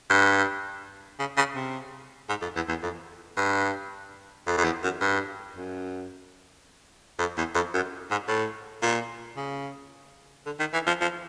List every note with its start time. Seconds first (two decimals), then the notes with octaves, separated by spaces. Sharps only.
0.10 G2
1.19 C#3
1.37 C#3
1.55 C3
2.29 G#2
2.42 F2
2.56 E2
2.69 E2
2.83 F2
3.37 G2
4.47 F2
4.57 F2
4.64 E2
4.83 F#2
5.01 G2
5.56 F#2
7.19 F2
7.37 E2
7.55 F2
7.74 F#2
8.11 G#2
8.28 A2
8.82 A#2
9.37 C#3
10.46 D3
10.59 D#3
10.73 E3
10.87 F3
11.01 F3